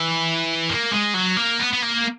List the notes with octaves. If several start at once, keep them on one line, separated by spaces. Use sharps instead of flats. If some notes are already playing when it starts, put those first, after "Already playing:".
Already playing: E3
A#3
G#3
F#3
A#3
B3
B3
A#3